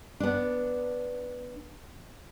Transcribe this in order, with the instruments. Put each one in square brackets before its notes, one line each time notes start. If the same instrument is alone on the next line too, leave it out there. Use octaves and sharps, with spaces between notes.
[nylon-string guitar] B3 D4